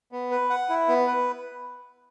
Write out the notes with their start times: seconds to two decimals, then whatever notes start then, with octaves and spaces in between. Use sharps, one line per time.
0.12 B3
0.31 B4
0.50 F#5
0.69 E4
0.88 B3
1.07 B4